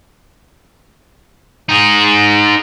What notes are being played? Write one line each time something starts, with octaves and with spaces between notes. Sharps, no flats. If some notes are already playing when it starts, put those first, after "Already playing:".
D#4 G#4